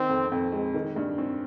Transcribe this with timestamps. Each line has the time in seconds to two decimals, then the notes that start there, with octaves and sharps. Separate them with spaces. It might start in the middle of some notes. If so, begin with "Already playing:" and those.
Already playing: D#3 C4
0.09 F2
0.32 F2
0.52 G#3
0.74 D#3
0.96 G2
1.18 C4